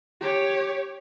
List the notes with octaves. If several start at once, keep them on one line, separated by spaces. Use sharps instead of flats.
G4 C#5